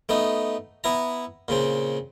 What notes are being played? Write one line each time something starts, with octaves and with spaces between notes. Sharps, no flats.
A3 B3 D#4
B3 E4 A#5
A#2 C#3 C4